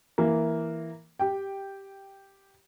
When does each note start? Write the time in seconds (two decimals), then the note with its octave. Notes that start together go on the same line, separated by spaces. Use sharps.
0.18 E3 A#3
1.19 G4 G5